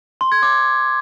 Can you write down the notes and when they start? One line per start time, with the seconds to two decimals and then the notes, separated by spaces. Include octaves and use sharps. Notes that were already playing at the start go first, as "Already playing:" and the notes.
0.21 C6
0.32 G#6
0.43 D6